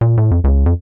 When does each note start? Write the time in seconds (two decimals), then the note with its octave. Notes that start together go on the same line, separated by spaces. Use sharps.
0.01 A#2
0.17 A2
0.31 F2
0.44 C#2
0.66 F2